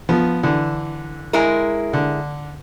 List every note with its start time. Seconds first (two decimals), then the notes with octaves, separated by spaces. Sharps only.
0.09 F3 B3
0.43 D3 E3
1.33 G#3 E4 A#4
1.93 D3